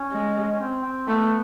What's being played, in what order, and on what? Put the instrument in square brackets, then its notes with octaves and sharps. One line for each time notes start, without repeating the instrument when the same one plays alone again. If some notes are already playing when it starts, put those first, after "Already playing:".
Already playing: [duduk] C#4
[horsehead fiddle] G#3
[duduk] C#4
C4
C4
[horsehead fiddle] A3 [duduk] B3